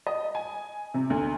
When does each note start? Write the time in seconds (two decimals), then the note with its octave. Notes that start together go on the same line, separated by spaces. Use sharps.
0.07 D#5
0.35 G#5
0.94 C3
1.10 D2